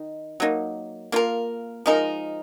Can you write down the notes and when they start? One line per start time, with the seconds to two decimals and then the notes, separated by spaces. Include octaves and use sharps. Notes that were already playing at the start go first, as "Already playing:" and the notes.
Already playing: D#3 D#4
0.40 F#3 A#3 D#4
1.12 A#3 F4 A#4
1.86 F3 G#3 D#4 A#4